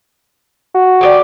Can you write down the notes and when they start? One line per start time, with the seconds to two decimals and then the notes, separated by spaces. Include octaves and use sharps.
0.74 F#4
1.01 G4 G#4 D5